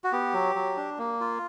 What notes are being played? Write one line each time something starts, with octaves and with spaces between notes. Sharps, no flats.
F#4
B3 G4
F#3
F#3
D4
A#3
F4